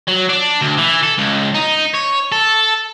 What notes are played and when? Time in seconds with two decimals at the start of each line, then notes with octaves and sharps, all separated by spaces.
0.08 F#3
0.29 D4
0.61 D2
0.77 E3
1.03 A4
1.18 C#2
1.55 D#4
1.94 C#5
2.32 A4